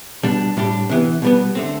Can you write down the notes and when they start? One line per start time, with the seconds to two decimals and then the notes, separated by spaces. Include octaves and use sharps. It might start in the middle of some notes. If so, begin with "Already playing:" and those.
0.23 B2 G3 D4
0.57 A2 G3 D4 G4
0.89 C3 E3 B3
1.22 B2 G3 B3
1.55 D3 A3 C4